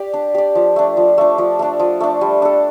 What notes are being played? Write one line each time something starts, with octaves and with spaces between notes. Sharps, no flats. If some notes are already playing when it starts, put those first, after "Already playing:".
Already playing: G4 D5
D4
G4 D5
F3
A3 D4
F3
A3 D4
F3
A3 D4
F3
A3 D4
G3
D4 A4